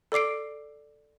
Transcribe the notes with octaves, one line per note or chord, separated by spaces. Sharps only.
A4 D5 D6 C7 D7